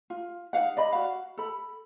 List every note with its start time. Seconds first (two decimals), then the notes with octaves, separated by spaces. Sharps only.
0.10 F4
0.53 D#4 G#4 F5 F#5
0.77 D5 D#5 B5
0.92 F#4 F5
1.38 A4 B5